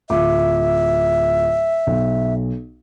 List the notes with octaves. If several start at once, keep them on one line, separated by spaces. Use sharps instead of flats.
D1 F4 E5 D6
B1